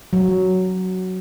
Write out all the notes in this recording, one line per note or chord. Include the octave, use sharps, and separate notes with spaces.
F#3